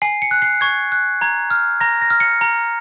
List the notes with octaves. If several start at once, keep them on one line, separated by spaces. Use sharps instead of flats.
G#5 C7
C#7
F#6
C7
C#6 G#6
F#6
A#5 G#6
F6
A#5 A#6
A#6
F6
C#7
A#5